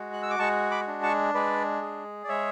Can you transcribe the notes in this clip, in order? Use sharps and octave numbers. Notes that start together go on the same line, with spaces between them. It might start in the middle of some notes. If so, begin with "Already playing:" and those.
Already playing: G#3 F#4
F#6
E6
D6
G#3 A5 C#6
B5 D6
D4
A5 C#6
G#3 B4 D5
G#4
D5
G#3 C#5 E5